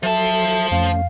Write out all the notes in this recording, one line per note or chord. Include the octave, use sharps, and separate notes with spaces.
F3 F#3 A4 E5 A5
F2 A3 C#4 F5